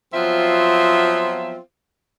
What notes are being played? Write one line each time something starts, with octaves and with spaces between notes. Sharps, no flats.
F3 F#3 B3 C4 F4 E5